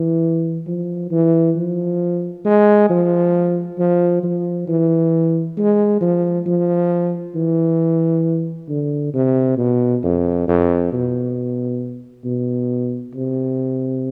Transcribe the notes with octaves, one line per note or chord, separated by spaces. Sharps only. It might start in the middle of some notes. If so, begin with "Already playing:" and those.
Already playing: E3
F3
E3
F3
G#3
F3
F3
F3
E3
G#3
F3
F3
E3
D3
C3
B2
F2
F2
B2
B2
C3